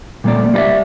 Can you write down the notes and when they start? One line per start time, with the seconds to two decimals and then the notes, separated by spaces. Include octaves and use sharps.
0.24 A#2 G3 A3 A#3 D5
0.54 G3 E4 B4 D5 E5